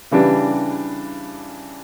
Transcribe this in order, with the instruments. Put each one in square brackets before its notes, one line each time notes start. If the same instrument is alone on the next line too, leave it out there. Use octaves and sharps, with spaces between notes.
[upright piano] C#3 E3 G3 D4